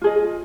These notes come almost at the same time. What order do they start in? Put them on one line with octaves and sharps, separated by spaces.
F4 G#4 D#5